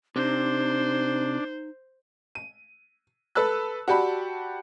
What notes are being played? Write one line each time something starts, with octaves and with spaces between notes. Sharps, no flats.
C3 D4 D#4 C5
D#7
A4 B4 A5 E6 F#6
F#4 G4 D5 A5 B5